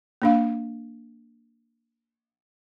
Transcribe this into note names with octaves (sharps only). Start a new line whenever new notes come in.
A#3 D4 F5